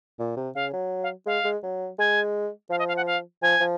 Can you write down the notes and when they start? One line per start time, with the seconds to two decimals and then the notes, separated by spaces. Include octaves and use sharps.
0.19 A#2
0.37 C3
0.55 C#3 F5
0.73 F#3
1.03 F5
1.26 G#3 F5
1.45 G#3
1.63 F#3
1.99 G#3 G#5
2.70 F3 F5
2.79 D#5
2.88 F5
2.97 F#5
3.06 F5
3.42 F3 G#5
3.60 F3